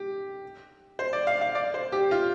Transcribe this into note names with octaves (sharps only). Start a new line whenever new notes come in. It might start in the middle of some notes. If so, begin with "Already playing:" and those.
Already playing: G4
C5
D5
F5
F5
D5
C5
G4
F4